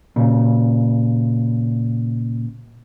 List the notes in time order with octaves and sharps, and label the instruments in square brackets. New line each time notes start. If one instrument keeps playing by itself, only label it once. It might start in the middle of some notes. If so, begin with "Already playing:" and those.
[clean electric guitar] A#2 C#3